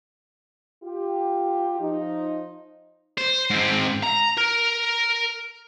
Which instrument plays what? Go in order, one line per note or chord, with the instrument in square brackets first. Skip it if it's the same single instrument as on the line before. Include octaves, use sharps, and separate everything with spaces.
[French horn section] F4 G4
F3 D#4
[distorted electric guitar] C5
G#2 C4
A#5
A#4